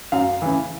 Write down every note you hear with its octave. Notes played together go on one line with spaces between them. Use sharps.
F#2 F5
C#3 E3